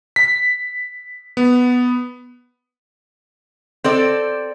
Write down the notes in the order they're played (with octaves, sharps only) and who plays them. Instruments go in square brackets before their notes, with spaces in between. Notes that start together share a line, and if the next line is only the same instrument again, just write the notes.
[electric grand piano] B6
B3
[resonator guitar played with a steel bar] C4 A4 D5